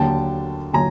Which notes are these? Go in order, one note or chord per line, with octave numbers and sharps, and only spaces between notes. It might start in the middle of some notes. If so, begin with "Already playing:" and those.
Already playing: D#2 D3 F#3 A#3 G5 A5
D3 F#3 A#3 G#5 A#5